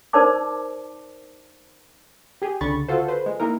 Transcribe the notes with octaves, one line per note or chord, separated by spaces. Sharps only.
D#4 A#4 C5 D5 A5 D6
G4 G#4
C#2 D3 B5 C#6 A6
F4 F#4 A4 C5
B4 C5
G#3
G#3 A#3 D#4 E4 A#4